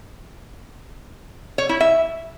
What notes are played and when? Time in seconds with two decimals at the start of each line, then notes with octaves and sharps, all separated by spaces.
1.58 C#5
1.69 E4
1.80 E5